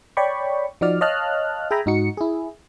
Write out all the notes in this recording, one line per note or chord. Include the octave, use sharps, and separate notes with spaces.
C#5 D5 G5 B5 C#6
F3 D#4 F#4 D5 F6
C#5 D#5 F5 A5 F6 F#6
G#4 E5 G5 G#5 A#5 B5
G#2 D#4 F#4 C#7
E4 G#4